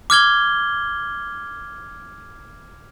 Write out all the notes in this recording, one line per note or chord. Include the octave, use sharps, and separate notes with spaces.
D6 F6 G#6 G7